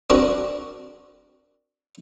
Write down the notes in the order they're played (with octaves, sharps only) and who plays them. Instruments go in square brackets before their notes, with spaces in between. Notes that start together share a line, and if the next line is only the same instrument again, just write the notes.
[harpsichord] C4 D4 F#4 A#4